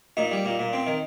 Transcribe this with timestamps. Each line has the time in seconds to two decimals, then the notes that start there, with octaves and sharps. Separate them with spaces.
0.17 A#2 D#4
0.31 G3
0.45 A#2
0.59 A#2
0.73 C4
0.86 D#3